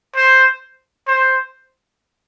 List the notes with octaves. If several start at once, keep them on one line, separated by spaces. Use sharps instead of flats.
C5
C5